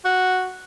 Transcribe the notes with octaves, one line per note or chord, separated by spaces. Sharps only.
F#4